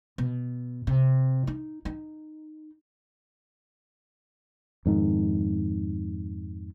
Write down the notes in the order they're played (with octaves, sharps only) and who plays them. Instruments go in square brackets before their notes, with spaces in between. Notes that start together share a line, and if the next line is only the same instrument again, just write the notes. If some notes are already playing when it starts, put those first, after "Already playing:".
[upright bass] B2
C3
D#4
D#4
[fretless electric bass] F2 G#2 D#3